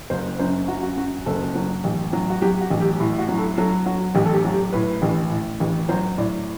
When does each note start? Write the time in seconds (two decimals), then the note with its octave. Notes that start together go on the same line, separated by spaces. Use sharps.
0.10 F#1 C5
0.39 F#2 C5
0.68 F#2 F#4
0.83 F#4
0.97 F#2 F#4
1.26 F#1 A4
1.55 F#3
1.84 A1
2.13 F#3
2.30 F#4
2.42 F#3 G4
2.61 F#4
2.70 A1
2.80 G4
3.00 A2
3.19 F#4
3.28 F#3
3.38 A4
3.58 F#3 A4
3.86 F#3 F#4
4.15 A1 G4
4.26 A4
4.34 G4
4.44 F#3
4.54 G4
4.73 A2 B4
5.02 A1
5.31 A2
5.60 A1
5.89 F#3 C5
6.18 A2 D5